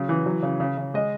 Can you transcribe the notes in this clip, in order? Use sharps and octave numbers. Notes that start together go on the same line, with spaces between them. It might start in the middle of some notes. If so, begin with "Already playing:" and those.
Already playing: C#3 F#3
E3
F#3
C#3
C#3
C#3
G#3 D#5